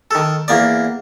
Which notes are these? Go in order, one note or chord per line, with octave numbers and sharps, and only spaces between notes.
D#3 A4
E2 A#3 D5